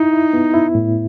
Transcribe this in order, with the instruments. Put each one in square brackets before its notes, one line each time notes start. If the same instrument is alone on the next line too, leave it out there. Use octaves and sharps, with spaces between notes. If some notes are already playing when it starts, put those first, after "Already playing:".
Already playing: [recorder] D#4 [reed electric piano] E4
[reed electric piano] E4
B3
E4
A2